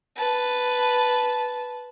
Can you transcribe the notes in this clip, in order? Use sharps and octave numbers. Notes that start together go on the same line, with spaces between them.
B4 A5